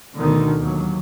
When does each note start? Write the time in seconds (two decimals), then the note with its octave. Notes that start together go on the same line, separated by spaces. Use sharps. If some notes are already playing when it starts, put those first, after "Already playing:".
0.17 D2 B2 D3 D#3
0.60 D#2 F#3